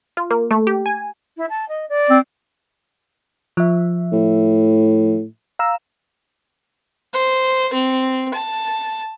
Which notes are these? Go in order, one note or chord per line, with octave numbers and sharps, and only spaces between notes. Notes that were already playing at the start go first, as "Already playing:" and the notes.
F4
A#3
A3
G4
G#5
E4
A5
D#5
D5
C4
F3 E5
A2
F5 A#5 E6
C5
C4
A5